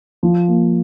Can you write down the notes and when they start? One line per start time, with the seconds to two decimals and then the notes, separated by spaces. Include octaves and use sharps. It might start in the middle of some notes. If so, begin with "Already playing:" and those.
0.23 F3
0.48 A#3